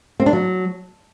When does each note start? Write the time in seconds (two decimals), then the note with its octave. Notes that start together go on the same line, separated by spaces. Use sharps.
0.20 C4
0.26 D4
0.33 F#3